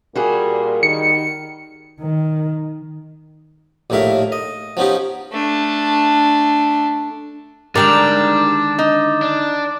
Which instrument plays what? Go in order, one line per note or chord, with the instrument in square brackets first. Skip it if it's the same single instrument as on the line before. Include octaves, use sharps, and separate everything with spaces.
[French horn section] A#2 A#4 [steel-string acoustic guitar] G3 F#4 G#4
[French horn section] D#3 [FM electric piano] C#7
[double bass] D#3
[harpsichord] A#1 D#2 A2 A#4 E5 F5
D#5
F3 B3 C#4 D#4 G4
[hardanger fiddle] A3 D4
[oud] D3 D#3 G#3 [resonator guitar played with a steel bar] G3 A#4 [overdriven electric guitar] D4 [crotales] D6 A6
[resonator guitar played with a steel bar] D#4
[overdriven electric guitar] D4